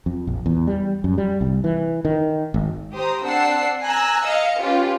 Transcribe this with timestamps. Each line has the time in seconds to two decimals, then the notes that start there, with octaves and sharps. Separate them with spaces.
0.06 F2
0.27 A#1
0.46 E2
0.67 G3
1.04 F#2
1.18 G3
1.41 C2
1.64 E3
2.05 D#3
2.54 G#1
2.94 G4 C5 A#5 D#6
3.25 C4 D4 F#5 E6 C7
3.84 G#5 A#5 E6 F#6
4.27 D#5 F5 C#7
4.62 C#4 F4 G4 B4